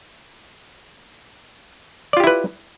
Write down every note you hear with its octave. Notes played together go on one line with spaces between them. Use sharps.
E4 F4 G4 B4 D5